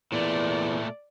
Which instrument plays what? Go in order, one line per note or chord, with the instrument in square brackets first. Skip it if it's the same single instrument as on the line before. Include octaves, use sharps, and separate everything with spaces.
[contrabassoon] E2 [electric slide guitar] A#2 A3 [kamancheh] D5